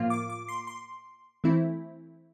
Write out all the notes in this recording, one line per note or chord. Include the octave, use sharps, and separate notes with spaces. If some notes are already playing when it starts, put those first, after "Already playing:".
Already playing: A2 F3 A#3 F4
D6
D6
C6
C6
E3 A3 C4 E4